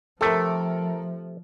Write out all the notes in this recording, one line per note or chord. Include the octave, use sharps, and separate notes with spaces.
C3 F3 A3 A4 A#4